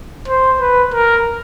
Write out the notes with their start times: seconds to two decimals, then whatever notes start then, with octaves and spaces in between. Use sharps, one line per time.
0.28 C5
0.61 B4
0.94 A#4